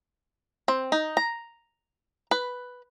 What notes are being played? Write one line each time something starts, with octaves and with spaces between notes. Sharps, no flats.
C4
D#4
A#5
B4